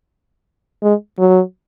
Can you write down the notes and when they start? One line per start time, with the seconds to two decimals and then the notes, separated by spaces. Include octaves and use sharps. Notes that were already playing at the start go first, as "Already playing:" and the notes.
0.83 G#3
1.19 F#3